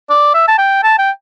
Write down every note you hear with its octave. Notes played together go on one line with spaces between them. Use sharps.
D5
E5
A5
G5
A5
G5